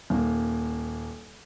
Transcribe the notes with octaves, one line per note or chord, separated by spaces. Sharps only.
D#1 A#3